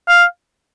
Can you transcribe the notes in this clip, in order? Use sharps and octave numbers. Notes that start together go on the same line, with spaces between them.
F5